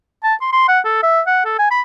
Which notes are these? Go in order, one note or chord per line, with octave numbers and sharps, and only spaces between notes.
A5
C6
C6
F#5
A4
E5
F#5
A4
G#5
B5